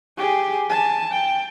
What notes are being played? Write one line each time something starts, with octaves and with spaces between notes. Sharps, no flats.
G4 G#4
G#5 A5
G5